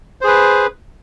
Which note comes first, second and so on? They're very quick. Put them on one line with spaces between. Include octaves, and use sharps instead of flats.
C5 G#4 B4